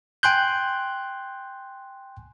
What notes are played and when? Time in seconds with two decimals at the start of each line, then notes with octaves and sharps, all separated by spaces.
0.23 G5 G#5 C6 F#6 G6